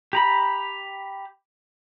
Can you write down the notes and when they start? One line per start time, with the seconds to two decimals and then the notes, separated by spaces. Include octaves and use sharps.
0.13 G4 A#5 B5